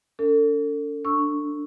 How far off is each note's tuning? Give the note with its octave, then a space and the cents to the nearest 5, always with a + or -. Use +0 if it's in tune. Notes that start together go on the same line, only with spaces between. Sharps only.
D4 -45 A4 +35
D4 +0 C#6 +0 E6 +0